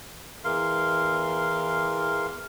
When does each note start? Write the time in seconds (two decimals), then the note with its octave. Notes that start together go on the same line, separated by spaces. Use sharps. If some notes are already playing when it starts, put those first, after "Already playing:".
0.44 E2 E3 A#4 F5 C6